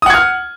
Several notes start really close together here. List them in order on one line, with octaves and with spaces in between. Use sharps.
D#6 F#5 G#6 F6